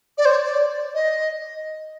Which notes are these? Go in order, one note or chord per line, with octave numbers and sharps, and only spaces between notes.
D5
C5
C#5
D5
D#5